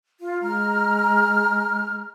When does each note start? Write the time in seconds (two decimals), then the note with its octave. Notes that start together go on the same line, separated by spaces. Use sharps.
0.20 F4
0.42 G#3 A#5 F6